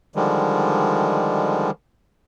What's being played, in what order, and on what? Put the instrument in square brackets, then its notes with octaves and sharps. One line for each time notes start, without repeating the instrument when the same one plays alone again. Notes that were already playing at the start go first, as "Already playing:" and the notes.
[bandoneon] D3 D#3 F3 G3 G#3